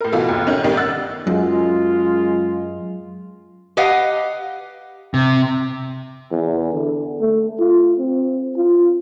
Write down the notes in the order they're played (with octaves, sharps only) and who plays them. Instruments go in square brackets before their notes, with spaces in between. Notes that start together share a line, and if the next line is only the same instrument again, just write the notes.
[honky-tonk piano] A2 A#4
B2 E3 A3 F4 F#4
A1 D#2
D#3 C#4
A1 D#3 G3
F#5 E6 F#6 A6
[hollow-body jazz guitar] F#2 [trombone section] G#3 F4
[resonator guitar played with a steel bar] G4 B4 D#5 F5 F#5
[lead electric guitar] C3
[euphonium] E2
D3
A3
F4
C4
F4